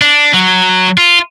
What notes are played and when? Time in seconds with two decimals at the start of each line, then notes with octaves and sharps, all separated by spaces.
0.02 D4
0.34 F#3
0.98 F4